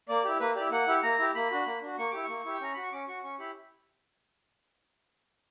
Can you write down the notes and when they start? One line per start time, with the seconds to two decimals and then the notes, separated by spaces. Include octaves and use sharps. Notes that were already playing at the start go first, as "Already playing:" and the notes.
0.09 A#3 D5
0.25 E4 G4
0.40 A#3 B4
0.55 E4 G4 D5
0.71 A#3 F#5
0.87 E4 G4
1.03 A#3 A#5
1.18 E4 G4
1.35 A#3 B5
1.51 D4 F#4
1.66 A#3
1.83 D4 F#4
1.98 A#3 C#6
2.11 E4 G4 D6
2.23 C#6
2.29 A#3
2.45 E4 G4
2.54 G5
2.61 C#4 A#5
2.74 F#4 B5
2.83 C#6
2.92 C#4 D6
3.08 F#4 C#6
3.24 C#4 C#6
3.39 E4 G4 B5